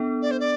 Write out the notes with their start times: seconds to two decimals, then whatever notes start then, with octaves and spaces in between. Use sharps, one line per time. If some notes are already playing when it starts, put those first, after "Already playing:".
Already playing: B3 D4 A4
0.21 D5
0.30 C5
0.39 D5